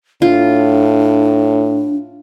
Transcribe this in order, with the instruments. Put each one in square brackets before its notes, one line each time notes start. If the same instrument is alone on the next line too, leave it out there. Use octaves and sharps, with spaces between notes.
[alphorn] A2 [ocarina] D4 [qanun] F4